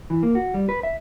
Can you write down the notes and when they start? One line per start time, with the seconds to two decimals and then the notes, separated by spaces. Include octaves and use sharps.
0.10 E3
0.23 A#3
0.35 F#4
0.54 G3
0.69 B4
0.83 E5